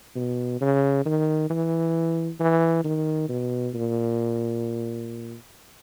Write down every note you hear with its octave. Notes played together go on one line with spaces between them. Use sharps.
B2
C#3
D#3
E3
E3
D#3
B2
A#2